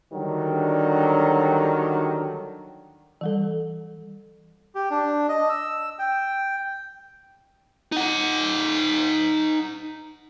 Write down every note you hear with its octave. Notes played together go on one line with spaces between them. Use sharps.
D3 D#3 F#3 G3 D4
E3 G3 A4
G4
D4
D#5
E6
G5
D#4 F#5